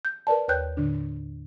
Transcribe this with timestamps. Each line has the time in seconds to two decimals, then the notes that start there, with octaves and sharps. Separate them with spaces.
0.05 G6
0.27 A#4 B4 D5 A5
0.48 D#2 B4 C#5 G5 F#6 G6
0.77 A2 D3 D4